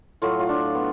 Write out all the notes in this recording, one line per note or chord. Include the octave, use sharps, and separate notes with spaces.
A2 F#3 A3 F4
F4
D4
B3